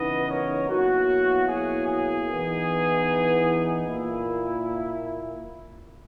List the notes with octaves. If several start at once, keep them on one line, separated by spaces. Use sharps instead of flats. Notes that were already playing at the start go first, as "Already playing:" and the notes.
Already playing: C#3 E3 B3 D#4 B4 D#5
A#4 C#5
B2 F#3 A#3 E4 F#4
G#4
G#4
E3 B3 D#4
A#2 A#3 E4